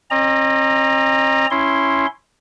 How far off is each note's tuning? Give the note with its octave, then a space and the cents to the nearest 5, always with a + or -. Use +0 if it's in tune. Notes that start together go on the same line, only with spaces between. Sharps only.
C4 +45 D#5 -35 A#5 +0
C#4 +0 E4 +0 C6 +0